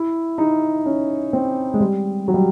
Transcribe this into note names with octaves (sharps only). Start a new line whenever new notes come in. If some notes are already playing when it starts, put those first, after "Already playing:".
Already playing: E4
D#4
C#4
C4
G#3
G3
F#3
G3